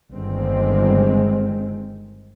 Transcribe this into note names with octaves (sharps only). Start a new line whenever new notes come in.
G1 D#3 G#3 C4